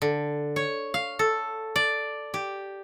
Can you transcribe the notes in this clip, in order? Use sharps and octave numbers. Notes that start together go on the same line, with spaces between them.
D3
C#5
F5
A4
D5
G4